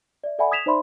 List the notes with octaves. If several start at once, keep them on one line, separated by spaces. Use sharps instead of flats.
D5 E5
A4 D5 E5 F#5 G#5 B5
D#6 G#6 B6 E7 F7
D#4 C5 D5 E5 B5 C6